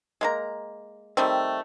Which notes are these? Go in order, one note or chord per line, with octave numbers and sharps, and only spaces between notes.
G#3 A#3 A#5
D#3 G3 A3 C4